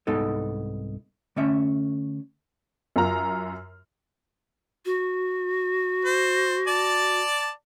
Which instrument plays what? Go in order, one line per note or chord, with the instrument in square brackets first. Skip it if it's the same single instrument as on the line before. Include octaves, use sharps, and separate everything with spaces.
[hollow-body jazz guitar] C2 G#2 G#3 B3 D#4 A4
D3 A3 C#4 E5
[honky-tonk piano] F#2 F4 A#4 A#5 F6
[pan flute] F#4
[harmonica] C5
D5 A5